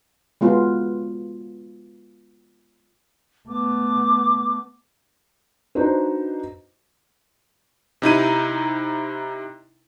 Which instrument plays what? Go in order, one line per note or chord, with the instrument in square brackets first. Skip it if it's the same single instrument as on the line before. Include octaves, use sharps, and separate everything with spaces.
[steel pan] G#3 B3 F4 F#4
[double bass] A3 B3 [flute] D6
[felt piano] D4 D#4 F#4 B4 C5
[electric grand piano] C3 D#4 E4 D#7